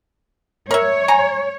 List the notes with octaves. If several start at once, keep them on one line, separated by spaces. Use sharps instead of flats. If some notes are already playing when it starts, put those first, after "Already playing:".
A#4 C#5 E5
G#5 A#5